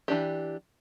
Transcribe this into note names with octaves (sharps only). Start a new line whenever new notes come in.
E3 D4 G4